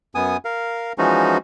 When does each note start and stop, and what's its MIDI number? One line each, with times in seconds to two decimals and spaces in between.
0.15 0.37 42
0.15 0.37 59
0.15 0.37 80
0.15 0.37 87
0.45 0.93 70
0.45 0.93 77
0.98 1.38 52
0.98 1.38 53
0.98 1.38 56
0.98 1.38 61
0.98 1.38 63
0.98 1.38 66